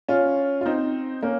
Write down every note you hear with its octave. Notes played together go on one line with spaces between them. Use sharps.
C#4 F4
F4
C4 D#4
A#3 C#4